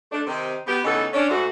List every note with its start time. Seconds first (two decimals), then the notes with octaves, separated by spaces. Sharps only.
0.12 A3 D4
0.27 C3 D#3 C4
0.67 B3 G4
0.85 C#3 E3 A3 B3 D#4 A4
1.14 C#4 D4
1.30 G#2 A3 F#4